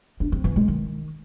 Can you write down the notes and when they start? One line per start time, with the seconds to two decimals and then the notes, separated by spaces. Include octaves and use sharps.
0.20 D4
0.32 C4
0.44 E3
0.56 G#3
0.68 D#3